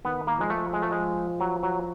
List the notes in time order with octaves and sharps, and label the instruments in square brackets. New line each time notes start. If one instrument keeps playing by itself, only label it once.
[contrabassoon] D#3 [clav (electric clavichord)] B3
[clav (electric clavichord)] A#3
[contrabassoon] F3 [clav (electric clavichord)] G#3
[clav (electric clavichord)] A3
G#3
A3
G#3
F#3
F#3